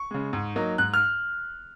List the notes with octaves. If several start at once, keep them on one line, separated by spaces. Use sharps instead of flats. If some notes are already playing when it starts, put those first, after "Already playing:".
Already playing: C#6
C#3 G#3
G#2
F#3 A#3 D#4
G#2 F#6
F6